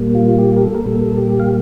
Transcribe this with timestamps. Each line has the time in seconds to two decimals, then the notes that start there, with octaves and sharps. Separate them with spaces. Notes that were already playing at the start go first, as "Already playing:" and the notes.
Already playing: A#2 G3 A#3
0.15 F4
0.38 G4
0.56 A#4
0.63 A4
0.74 A#4
0.86 A#2 G3 A#3 A4
1.17 G4
1.40 F5